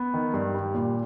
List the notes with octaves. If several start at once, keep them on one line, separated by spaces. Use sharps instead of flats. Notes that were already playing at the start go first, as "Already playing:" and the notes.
Already playing: B3
D#3
G2
G3
A#2